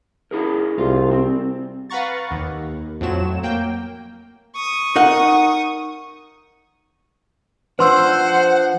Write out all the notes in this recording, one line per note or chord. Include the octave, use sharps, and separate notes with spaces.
E4 G#4 A#4
C2 F4
C4
B4 F5 F#5 A#5 C#6 A6
D#2
F2 A2 F#3 E7
A#3 G5
C#6 D#6
D#4 A#4 F#5
F3 D4 B4 C5 F#5 C6 E6